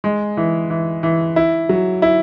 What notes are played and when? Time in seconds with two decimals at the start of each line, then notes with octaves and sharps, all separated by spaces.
0.04 G#3
0.37 E3
0.70 E3
1.03 E3
1.36 E4
1.69 F#3
2.02 E4